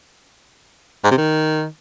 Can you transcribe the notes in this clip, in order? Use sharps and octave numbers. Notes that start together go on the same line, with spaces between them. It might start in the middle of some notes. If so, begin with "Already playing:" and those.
G#2
C3
D#3